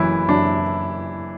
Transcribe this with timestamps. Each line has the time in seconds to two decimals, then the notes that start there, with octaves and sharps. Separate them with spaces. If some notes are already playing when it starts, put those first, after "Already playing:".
Already playing: F#1 F#2 E3 F#3 E4
0.28 F#1 F#2 F#3 D4